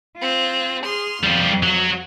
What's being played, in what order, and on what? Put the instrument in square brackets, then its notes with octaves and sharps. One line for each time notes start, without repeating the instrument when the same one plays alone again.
[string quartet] C4 F4
G#4 C6 F6
[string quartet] F2 [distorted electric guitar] G3 F4
[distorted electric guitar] F#3